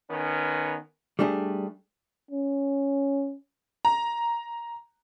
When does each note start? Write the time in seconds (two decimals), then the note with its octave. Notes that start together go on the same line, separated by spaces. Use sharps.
0.11 D#3 B3 C#4 B4
1.19 G3 A3 D4 G4 G#4
2.31 C#4
3.85 A#5